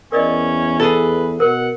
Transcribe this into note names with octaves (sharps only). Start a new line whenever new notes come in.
E2 C#4 A#4 D5 D#5
G#4 A4 B4
B2 A#4 F#5